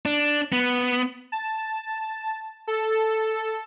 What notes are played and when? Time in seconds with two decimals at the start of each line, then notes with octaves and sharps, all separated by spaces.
0.06 D4
0.53 B3
1.32 A5
2.67 A4